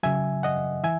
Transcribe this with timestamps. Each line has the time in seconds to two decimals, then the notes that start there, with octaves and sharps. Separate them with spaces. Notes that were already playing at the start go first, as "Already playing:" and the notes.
0.03 C#3 F#3 E5 G#5
0.43 D#5 F#5
0.84 E3 E5 G#5